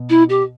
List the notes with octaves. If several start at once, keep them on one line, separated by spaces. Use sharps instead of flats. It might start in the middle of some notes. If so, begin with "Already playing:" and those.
Already playing: B2
E4
G4